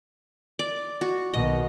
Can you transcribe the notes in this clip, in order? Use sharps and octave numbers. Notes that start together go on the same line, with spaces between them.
D5
F#4
B1 B2 D#3 D#5